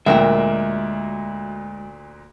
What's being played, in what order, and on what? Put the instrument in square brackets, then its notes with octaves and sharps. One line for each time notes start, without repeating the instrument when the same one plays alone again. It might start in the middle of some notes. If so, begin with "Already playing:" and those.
[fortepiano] D2 A#2 [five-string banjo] F#3 A#4 G5 [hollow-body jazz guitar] G#3 [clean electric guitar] E5